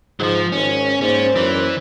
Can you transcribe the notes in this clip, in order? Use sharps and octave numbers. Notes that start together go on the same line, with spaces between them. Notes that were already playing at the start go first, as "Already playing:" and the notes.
G#2 F3 F#3
G#1 C#4
G#2 A#3 C#4 C5 D5
F#2 E3